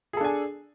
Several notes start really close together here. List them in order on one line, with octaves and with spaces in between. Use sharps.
G#4 A4 D4 G#5